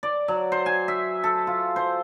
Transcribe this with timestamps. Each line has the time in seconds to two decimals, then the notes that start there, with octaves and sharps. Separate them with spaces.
0.03 D5
0.28 F#3
0.52 C5
0.66 G#5
0.88 E5
1.24 A4
1.47 F4
1.76 C5